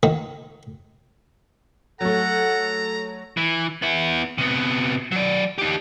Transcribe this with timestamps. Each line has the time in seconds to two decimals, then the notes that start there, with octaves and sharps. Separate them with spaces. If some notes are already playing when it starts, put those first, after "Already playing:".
0.03 D#3 A#3
2.01 F#3 A3 A4 F#5 A#5
3.37 E3
3.82 B3 E4
4.38 C3 B3
5.12 F#3 D5
5.58 D#4 G4